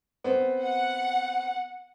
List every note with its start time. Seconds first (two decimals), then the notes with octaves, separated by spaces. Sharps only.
0.24 B3 C4
0.63 F#5